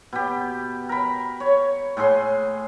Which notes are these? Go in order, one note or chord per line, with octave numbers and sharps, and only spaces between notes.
B2 G4
A#4 B5
C#5
A2 G#3 G#4 C6